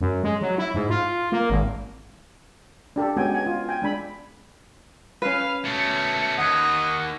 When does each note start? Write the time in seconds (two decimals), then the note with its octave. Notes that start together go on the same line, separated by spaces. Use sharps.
0.01 F#2
0.24 G#3
0.41 F#3
0.58 E4
0.74 G#2
0.90 F4
1.32 A#3
1.50 G#1
2.96 D4 G4 A4
3.16 G#3 B3 C#4 F#4 G5 G#5
3.35 G#5
3.46 F4
3.69 G5 G#5
3.82 G#3 D4 B5
5.22 C#4 B4 F5
5.65 B2 A3 C#7
6.38 D#2 D#5 F#5
6.62 C#6